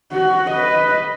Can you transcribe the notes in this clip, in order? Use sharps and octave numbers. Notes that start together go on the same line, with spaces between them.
F#4
B4 D#5